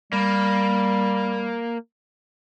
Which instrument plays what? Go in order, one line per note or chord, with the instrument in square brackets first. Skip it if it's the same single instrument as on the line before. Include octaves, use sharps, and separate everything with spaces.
[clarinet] G3 [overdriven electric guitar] A#3